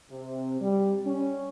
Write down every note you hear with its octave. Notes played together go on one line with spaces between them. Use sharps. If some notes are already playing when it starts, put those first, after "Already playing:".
C3
G3
C#4